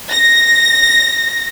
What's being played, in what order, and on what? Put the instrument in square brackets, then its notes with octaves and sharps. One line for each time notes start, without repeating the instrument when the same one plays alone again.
[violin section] A#6